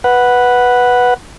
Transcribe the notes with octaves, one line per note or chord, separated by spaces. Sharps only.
B4 F#5